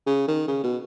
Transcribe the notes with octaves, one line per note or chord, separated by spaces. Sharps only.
C#3
D#3
C#3
B2